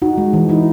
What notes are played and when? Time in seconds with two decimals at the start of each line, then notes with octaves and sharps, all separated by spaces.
0.02 D#4 F#4
0.18 G#3
0.33 E3
0.49 D#4 E4